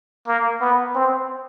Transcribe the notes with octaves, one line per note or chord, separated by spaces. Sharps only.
A#3
B3
C4